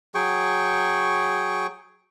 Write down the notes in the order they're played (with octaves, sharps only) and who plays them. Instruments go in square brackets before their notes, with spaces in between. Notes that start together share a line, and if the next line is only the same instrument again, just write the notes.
[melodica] F#3 G#4 G5 C#6